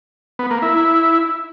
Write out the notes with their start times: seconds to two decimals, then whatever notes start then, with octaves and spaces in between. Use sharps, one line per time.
0.39 B3
0.51 A#3
0.62 E4